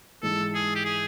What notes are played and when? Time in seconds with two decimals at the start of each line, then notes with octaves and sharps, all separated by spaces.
0.23 G#2 E3 G#3 A4
0.55 G#4
0.75 G4
0.85 G#4